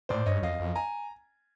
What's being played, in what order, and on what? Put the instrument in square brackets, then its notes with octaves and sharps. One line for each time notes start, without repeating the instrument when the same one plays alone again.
[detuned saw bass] A2 [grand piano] C5 D5
[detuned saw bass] G2 [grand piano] C#5 D#5
[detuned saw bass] F2 [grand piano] D#5 F5
[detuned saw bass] F2
[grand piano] G#5 A#5